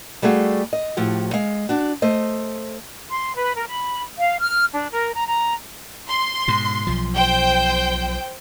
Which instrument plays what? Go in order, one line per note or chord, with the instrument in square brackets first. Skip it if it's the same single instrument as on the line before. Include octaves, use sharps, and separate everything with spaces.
[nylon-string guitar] G3 A3 F#4 G#4 F5
D#5
A2 F3 F#4 G4
G#3 F5
D4 F#4
A3 C5 D#5
[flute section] C6
B4
A#4
B5
F5
F6
D4
A#4
A#5
A#5
[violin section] C6
[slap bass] G#2 B2
B1 F3
[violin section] C5 G5 G6